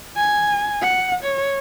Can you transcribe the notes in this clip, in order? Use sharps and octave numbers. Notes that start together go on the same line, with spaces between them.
G#5
F#5
C#5